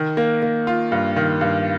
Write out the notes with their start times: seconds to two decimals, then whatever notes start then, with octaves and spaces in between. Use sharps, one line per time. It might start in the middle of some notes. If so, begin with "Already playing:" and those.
Already playing: D#3
0.17 A#3
0.42 A#3
0.67 F4
0.92 G2
1.16 D#3
1.41 G2